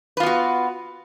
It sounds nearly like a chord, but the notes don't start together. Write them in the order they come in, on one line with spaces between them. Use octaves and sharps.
B4 F4 B3 F#4